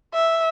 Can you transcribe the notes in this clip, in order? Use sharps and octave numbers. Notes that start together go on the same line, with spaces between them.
E5